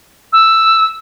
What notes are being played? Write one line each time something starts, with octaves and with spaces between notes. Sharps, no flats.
E6